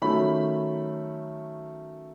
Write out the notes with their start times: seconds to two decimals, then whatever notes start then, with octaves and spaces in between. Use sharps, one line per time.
0.02 D#3 F#3 A3 C#4 B5